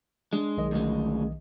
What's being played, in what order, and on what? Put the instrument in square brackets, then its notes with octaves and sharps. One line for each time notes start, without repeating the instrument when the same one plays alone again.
[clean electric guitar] G#3 [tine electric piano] D4
[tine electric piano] B1 D#3 D#5
[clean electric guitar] D2 G#3